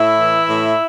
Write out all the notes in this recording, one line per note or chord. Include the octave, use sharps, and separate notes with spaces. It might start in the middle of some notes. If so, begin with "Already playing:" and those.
Already playing: A2 E4 E5
E3
A2